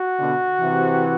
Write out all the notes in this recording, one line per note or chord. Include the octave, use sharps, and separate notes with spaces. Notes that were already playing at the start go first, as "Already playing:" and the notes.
Already playing: F#4
B2 D3
C3 E3